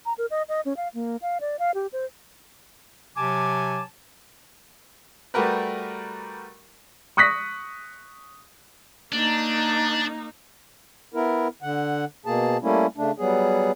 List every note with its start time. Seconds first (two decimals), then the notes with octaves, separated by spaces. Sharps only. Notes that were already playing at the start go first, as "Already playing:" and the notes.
0.06 A#5
0.18 A#4
0.31 D#5
0.49 D#5
0.65 C#4
0.77 F5
0.94 A#3
1.22 F5
1.41 D5
1.59 F5
1.75 G4
1.93 C5
3.16 C3 F#3 G#5 A5 D6
5.34 G3 A3 F#4 G4 A#4 B4
7.17 C#6 D#6 F#6 A#6 B6
9.12 A#3 D4 D#4
11.14 B3 E4 A#4
11.63 D3 F#5
12.26 B2 A#3 G#4 A5
12.62 G3 A3 A#3 C#4 E4
12.97 C#3 A3 D4
13.18 F#3 G3 B3 G#4